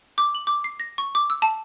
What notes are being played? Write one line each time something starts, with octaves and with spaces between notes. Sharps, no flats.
D6
F#7
D6
C7
A#6
C#6
D6
E6
A5